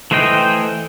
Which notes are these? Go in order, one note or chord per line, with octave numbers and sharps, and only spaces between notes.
E3 A3 C5 D#5 G5